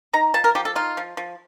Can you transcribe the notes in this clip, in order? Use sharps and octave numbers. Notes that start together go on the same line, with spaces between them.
D#4 A#5
F3 A5
A#4
F3 G4
A4
D#4 F4
F3
F3